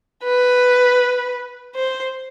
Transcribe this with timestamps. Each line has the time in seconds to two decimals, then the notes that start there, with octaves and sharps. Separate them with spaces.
0.25 B4
1.76 C5